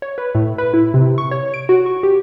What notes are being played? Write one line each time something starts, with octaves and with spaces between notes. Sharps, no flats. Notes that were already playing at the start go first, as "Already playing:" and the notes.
C#5
B4
A2
B4
E4
C3
C#6
C#5
D7
F#4
C#6
G4